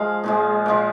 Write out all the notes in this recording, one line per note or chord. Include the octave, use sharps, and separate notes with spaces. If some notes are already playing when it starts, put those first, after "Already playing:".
Already playing: F3 G#3 F5
A#2 F3 G#3
A#2 F3 G#3